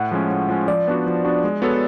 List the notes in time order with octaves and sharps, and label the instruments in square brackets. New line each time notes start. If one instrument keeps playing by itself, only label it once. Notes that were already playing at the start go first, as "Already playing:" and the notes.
Already playing: [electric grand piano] A2 [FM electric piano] F#5
[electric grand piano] F3 G#3 C#4
A2
F3 G#3 C#4
[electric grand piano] F3 [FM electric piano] D5
[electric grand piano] B3 D4 F#4
F3
B3 D4 F#4
G#3
B3 F#4 A4 C#5